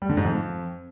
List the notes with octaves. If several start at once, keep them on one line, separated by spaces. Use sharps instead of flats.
G3
D3
G#2
F2